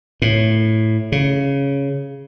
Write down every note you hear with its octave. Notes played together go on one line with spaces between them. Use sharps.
A2
C#3